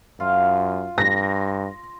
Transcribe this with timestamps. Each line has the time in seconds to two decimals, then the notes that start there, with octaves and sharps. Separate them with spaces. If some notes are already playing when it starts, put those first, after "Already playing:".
0.20 F#2 F4
0.98 G2 A#6